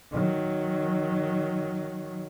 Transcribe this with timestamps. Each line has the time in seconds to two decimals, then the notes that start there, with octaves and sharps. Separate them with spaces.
0.12 D#3 F#3